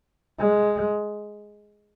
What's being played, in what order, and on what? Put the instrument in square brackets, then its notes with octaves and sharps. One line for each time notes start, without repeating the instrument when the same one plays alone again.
[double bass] G#3